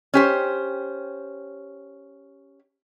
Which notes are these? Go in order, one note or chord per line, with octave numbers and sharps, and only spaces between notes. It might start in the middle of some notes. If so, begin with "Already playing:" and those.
C#4 G4 C5